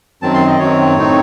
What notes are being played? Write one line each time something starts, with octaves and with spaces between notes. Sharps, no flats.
F#2 D#3 F#3 C4 A5
C6
D#5
F#2 D#3 F#3 C4 C#5
A2 A3 C4 D#4